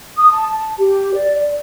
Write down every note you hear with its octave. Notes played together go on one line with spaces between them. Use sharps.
D#6
A5
G4
D5
D5